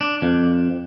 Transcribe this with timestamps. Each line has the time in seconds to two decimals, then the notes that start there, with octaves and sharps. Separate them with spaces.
0.01 D4
0.22 F2